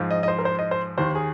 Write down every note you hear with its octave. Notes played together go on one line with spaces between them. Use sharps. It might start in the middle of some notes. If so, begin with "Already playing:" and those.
Already playing: G#2 F3
D#5
D#5
C5
A#4
C5
D#5
C5
D#2 D#3 C5
G#4